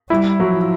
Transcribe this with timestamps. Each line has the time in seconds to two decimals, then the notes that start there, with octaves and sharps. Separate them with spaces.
0.10 G3 E4
0.40 F3 F#3